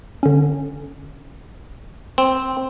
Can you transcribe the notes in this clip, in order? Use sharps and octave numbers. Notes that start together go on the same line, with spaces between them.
D3 C#4
C4